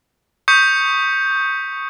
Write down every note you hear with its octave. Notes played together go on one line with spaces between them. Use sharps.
C#6 D#6 G6 B6 C#7